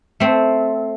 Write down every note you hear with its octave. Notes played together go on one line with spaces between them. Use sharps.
A3 C4